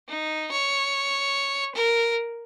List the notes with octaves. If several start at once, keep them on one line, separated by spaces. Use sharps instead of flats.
D#4
C#5
A#4